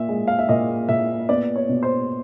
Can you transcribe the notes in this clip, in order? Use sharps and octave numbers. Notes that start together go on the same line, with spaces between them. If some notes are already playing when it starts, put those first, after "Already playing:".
Already playing: A#2 E5
G#3
F5
E5
A#2 D#5
A#2 E5
B3 D5
C#5
B2
C5